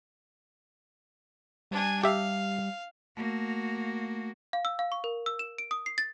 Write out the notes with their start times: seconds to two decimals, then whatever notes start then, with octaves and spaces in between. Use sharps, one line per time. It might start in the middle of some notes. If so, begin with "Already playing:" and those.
1.71 G3 D4 G#5
2.03 G4 E5 F5
3.17 A3 A#3 F#4
4.53 F5
4.65 E6
4.79 F5
4.92 C#6
5.04 A#4
5.26 E6
5.39 E7
5.58 D7
5.71 D#6
5.86 C7
5.98 A6